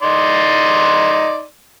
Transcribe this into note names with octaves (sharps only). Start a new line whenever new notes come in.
D#4 D5 C6